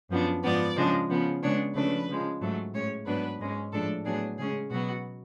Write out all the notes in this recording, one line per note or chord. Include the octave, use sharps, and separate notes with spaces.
F#2 F3 B3 D4
G#2 F3 B3 D5
C#3 F3 G#3 D4
C#3 F3 B3
C#3 G#3 B3 D4 C#5
C#3 F3 A3 D4 B4
C#3 F3 G#3
G#2 F#3 A3
A2 G#3 C#4 C#5
G#2 F#3 B3 D4 B4
G#2 G#3 C#4
A2 F3 G#3 D4 A4
A2 F#3 B3 D4 G#4
C#3 G#3 C#4 G#4
B2 F#3 B3 F#4